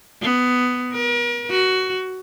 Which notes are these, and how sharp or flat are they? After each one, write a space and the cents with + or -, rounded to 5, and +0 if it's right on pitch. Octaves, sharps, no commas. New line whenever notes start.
B3 +10
A#4 +40
F#4 +15